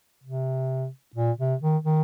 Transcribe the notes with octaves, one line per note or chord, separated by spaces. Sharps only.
C3
A#2
C3
D#3
D#3